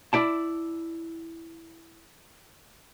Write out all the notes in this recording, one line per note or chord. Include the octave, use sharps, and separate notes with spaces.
E4 D5 A5